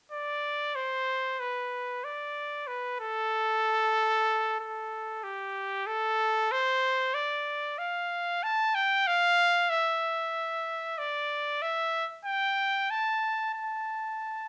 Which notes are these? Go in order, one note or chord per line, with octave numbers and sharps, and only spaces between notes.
D5
C5
B4
D5
B4
A4
A4
G4
A4
C5
D5
F5
A5
G5
F5
E5
D5
E5
G5
A5
A5